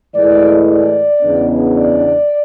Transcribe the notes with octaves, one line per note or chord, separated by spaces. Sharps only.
A2 E3 G#3 D5
D5
E2 C#3 G#3 B3 D4
D5